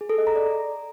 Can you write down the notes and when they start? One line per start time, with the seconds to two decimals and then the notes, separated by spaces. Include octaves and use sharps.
0.01 G#4
0.09 A4
0.18 D#5
0.27 A#5
0.36 D5